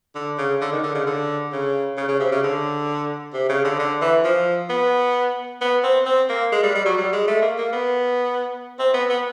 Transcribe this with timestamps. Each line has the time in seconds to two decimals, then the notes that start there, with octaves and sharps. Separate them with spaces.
0.15 D3
0.38 C#3
0.61 D3
0.72 D#3
0.83 D3
0.95 C#3
1.07 D3
1.52 C#3
1.97 C#3
2.08 C#3
2.20 C3
2.32 C#3
2.43 D3
3.33 C3
3.49 C#3
3.64 D3
3.79 D3
4.01 E3
4.24 F3
4.69 B3
5.61 B3
5.83 C4
6.06 C4
6.29 A#3
6.52 G#3
6.63 G3
6.75 G3
6.85 F#3
6.97 G3
7.13 G#3
7.28 A3
7.42 A#3
7.58 A#3
7.72 B3
8.79 C4
8.94 B3
9.09 B3